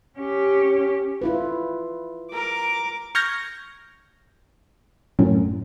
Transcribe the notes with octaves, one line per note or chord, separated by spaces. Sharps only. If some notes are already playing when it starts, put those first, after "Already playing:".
C#4 G4
E4 F4 B4
A#4 D6
C#6 F6 G6 G#6 A#6
F#2 A2